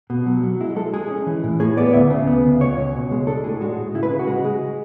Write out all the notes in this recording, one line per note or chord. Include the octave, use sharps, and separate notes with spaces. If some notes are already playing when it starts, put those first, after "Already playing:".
B2
F#3
F#3
G#3 E4
G#3 A4
G#3 G#4
C#4
E3
A2
A2 G#4
B3 D5
D2 E5
C#3
B3
D2
C#2 C#5
C#2
B2
G#3
D4 A4
A2 G#4
G#3 F#4
A2
C#3 E4
B4
C#3 G#4
F#4
G#3
G#3